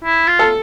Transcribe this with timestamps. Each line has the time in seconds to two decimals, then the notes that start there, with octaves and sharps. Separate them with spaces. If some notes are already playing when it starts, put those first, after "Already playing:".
0.04 E4
0.27 F4
0.39 A4